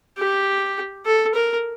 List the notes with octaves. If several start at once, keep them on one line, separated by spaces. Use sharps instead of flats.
G4
A4
A#4